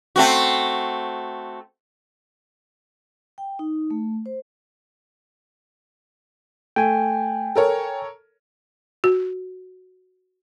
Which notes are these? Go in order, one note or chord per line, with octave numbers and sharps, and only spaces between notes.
A3 C4 F#4
G5
D#4
A3
C5
A3 G5 G#5
A4 A#4 C#5
F#4